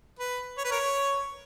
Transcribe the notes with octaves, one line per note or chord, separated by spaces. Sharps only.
B4
C#5
B4
A#4 C#5